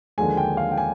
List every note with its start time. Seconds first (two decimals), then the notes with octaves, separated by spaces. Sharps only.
0.18 D#2 D3 F3 G#3 G#5
0.37 G5
0.57 F5
0.72 G5
0.77 G#5